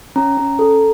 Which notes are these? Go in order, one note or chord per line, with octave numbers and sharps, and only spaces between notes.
C#4 A#5
C#4
A4